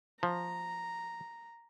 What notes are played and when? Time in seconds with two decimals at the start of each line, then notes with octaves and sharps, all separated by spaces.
0.23 F3 A#5